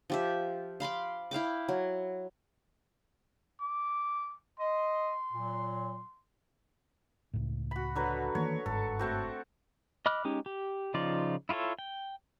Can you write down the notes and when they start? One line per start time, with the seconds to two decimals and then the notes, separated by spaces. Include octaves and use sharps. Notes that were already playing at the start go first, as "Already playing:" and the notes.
0.10 F3 G4 E5
0.80 F5 B5 C6 D6
1.31 E4 F5 G5 D6
1.68 F#3
3.61 D6
4.60 D#5 C6
5.32 A#2 F#3
7.34 C#2 A2
7.71 F#4 B5
7.95 D3 F#3 B4
8.35 D#3 E3 A#3 C#5
8.66 G1 G#2 A4
8.99 A3 C4 F#4
10.06 D#5 B5 D6 F6 F#6
10.25 G#3 C#4 D#4 G4
10.46 G4
10.94 C#3 F3 D#4 F4 D5
11.49 E4 F4 G4 A4 C#5
11.79 G5